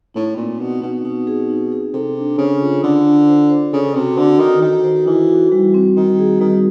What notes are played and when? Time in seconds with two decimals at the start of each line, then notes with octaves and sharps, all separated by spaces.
0.14 A2 D#4
0.37 A#2 C4
0.59 B2 C4
0.82 B2 D#4
1.04 B2 D#4
1.27 G#4
1.49 D#4
1.72 G#4
1.94 C3 A4
2.17 D4
2.38 C#3 C5
2.61 F4
2.83 D3 D4
3.05 D4
3.29 C5
3.50 C5
3.73 C#3 A4
3.94 C3 F#4
4.17 D3 F#4
4.39 D#3 F#4
4.62 D#3 F#4
4.84 C5
5.07 E3 D#4
5.29 F#4
5.51 E3 G3
5.74 C4
5.96 D#3 C4
6.19 G#4
6.40 D#3 G3